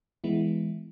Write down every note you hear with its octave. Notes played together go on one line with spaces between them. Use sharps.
E3 G#3 B3 E4